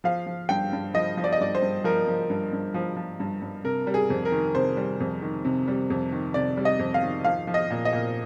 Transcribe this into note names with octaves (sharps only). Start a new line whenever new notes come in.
F3 F5
F3
G2 G5
G2
F3 D#5
F3
D5
D#5
G2 D5
C5
G2
F3 A#4
F3
G2
G2
F3
F3
G2
G2
C3 A#4
G3
G#4
F2
A#4
D#3
C3 C5
G3
F2
D#3
C3
G3
F2
D#3
C3 D5
G3
D#5
F2
F5
D#3
F3 F5
F3
D#5
A#2
D#5
A#2